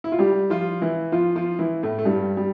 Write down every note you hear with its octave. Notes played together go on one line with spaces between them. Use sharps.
E4
F4
G3 G4
F3 F4
E3 E4
F3 F4
F3 F4
E3 E4
A2 A3
A3
G2 G3
G3